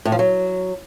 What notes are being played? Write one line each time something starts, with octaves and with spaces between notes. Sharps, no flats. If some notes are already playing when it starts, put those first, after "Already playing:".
A2
F3
F#3